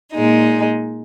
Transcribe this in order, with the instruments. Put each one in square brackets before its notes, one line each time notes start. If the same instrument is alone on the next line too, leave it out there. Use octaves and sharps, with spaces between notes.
[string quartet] A#2 G#3 D#4